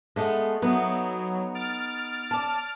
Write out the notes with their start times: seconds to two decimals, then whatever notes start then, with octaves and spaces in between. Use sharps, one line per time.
0.16 G#3 A3 B3
0.62 F#3 B3 D#4
1.54 F6 A6 D7
2.31 D5 A5